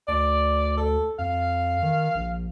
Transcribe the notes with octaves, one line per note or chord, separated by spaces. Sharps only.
D2 D5
A4
F2 F5
D#3
A#1